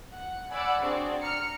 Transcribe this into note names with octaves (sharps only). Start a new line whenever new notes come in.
F#5
D5 F#5 G#5 B5 E6
C4 D4 F#4 G#4 D5
A#5 F6 C#7